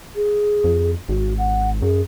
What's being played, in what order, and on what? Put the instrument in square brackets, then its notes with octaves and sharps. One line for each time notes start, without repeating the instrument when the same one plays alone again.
[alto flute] G#4
[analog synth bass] F2
[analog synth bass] G#1 [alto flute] F#4
[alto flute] F#5
[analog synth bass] F#2 [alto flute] G#4